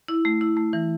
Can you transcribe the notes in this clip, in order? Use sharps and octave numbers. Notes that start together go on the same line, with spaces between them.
E4
A3
E4
A3
E3